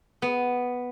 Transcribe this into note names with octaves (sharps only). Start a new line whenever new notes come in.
B3